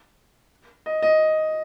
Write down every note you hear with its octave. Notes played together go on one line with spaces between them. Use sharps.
D#5
D#5